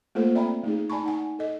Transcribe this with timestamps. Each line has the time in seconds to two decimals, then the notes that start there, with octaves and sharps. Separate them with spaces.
0.15 A3 A#3 F4 A4 C5
0.35 C4 D5 E5 G5 A#5 B5
0.64 A3 D#4 G#4
0.90 D5 G#5 A5 B5 C#6
1.04 D#4 F#5 G#5
1.39 A4 D#5